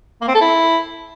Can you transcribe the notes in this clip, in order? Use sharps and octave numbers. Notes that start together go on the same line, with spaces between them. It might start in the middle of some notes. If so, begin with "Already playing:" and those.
A#3
C4
A4
E4